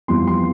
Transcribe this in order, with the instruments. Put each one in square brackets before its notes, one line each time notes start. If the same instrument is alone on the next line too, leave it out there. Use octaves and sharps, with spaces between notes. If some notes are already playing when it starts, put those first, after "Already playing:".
[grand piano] F2 E3 G3 B3 C6
C6